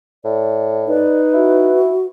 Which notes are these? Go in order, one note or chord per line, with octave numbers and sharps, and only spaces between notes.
A2 D5
D#4 B4 D5
E4 F#4